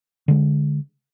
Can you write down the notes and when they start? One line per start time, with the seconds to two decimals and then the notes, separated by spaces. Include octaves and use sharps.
0.28 D3 G#3